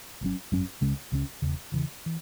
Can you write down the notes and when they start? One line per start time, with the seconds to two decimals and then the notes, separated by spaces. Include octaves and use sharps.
0.21 G#1 F#2 F#3 C#4
0.52 G#1 F#2 F#3 C#4
0.81 C#2 C#3 G#3 C#4
1.12 C#2 C#3 G#3 C#4
1.42 E1 E2 C#3 E3
1.72 E1 E2 C#3 E3
2.06 E3